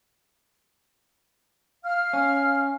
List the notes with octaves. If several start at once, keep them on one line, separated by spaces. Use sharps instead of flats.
F5 F6
C#4